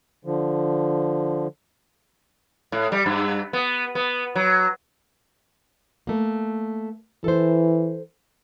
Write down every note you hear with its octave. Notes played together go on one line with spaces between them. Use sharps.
D3 F3
A2
G3
G2
B3
B3
F#3
A3 A#3
E3 A4 C5